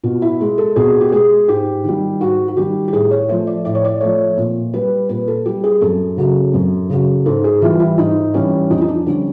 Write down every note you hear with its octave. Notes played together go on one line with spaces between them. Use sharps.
B2 F4
E4
G#3
A4
B2 G#4
G4
G#3 G#4
G#2 G4
D#3 G3
G#2 F#4
F#4
D#3 G3 G4
G4
A2 G#4
C#5
F3 A3 C5
D5
A2 D5
C#5
D5
F3 A3 C#5
A#2
G3 B4
A#2 B4
A4
G3 G4
G#4
F#2 A4
C#3 F#3
F#2
C#3 F#3
G#2 A4
G#4
E3 G3 F4
E4
G#2 D#4
E3 G3 C#4
F2 D#4
D#4
D4
D3 G3 C#4